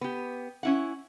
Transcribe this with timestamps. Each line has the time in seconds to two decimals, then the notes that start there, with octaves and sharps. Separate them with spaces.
0.01 B3 G4
0.63 C#4 E4 F#5